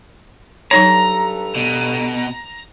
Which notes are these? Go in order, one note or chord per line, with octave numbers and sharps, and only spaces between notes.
G2 F#3 D#4 A4 B4 C#5 A#5
B2